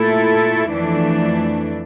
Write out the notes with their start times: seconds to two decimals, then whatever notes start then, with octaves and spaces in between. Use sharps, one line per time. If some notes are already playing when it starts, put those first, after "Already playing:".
Already playing: A#2 A3 E4 A4
0.71 F2 E3 A3 D4